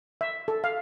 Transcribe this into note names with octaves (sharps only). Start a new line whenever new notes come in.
E5
A4
F5